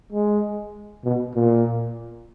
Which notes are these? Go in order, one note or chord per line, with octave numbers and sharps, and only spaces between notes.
G#3
B2
A#2